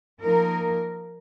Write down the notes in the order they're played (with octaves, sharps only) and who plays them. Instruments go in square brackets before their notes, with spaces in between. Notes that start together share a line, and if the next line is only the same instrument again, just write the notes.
[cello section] F3 A#3 D#4 A#4